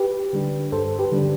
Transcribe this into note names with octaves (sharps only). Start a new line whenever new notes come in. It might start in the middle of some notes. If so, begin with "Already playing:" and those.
Already playing: G4 B4
D3 G3 D4
G2 A4 C5
G4 B4
D3 G3 D4